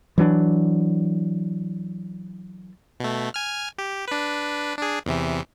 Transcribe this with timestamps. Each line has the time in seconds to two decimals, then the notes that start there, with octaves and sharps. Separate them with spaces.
0.18 E3 F#3 C#4 D4
3.00 B2 A3
3.34 G#5 F6
3.78 G4
4.08 D4 B4
4.79 D4 G#4
5.06 E2 C3 E3